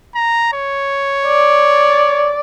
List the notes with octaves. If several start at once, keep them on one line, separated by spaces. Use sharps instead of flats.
A#5
C#5
D5